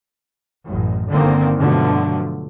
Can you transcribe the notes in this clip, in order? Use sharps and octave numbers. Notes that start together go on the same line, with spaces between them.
A1 F#2
G1 D3 D#3 A#3 C4
G2 B2 D3 F3 F#3 A3